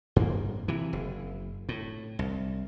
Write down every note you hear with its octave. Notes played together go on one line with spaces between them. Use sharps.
G2 A#3
C3 E3
F#1
A2
C2